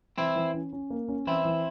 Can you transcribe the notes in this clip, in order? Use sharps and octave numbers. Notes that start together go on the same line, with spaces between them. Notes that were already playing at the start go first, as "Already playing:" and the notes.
E3 C4 E4
E3
C#4
C#4
A#3
C#4
E3 C4 E4
E3